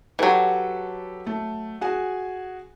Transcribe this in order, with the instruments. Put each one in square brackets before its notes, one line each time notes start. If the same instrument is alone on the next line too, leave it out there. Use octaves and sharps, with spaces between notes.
[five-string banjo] E3 F#3 [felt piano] G4 A4 B4
[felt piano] A3
F#4 G#4 G#5